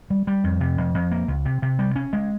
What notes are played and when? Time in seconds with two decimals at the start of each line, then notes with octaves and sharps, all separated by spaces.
0.10 G3
0.27 G3
0.44 F2
0.61 C3
0.78 F2
0.94 F2
1.11 A#3
1.28 C#2
1.45 C3
1.62 C3
1.79 G3
1.96 C#4
2.13 G#3